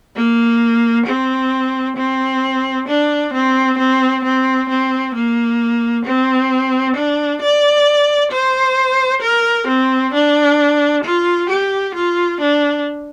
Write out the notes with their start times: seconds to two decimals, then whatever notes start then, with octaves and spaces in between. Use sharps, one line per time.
0.16 A#3
1.06 C4
1.97 C4
2.88 D4
3.34 C4
3.79 C4
4.24 C4
4.69 C4
5.15 A#3
6.06 C4
6.97 D4
7.42 D5
8.32 C5
9.22 A#4
9.68 C4
10.14 D4
11.04 F4
11.50 G4
11.95 F4
12.41 D4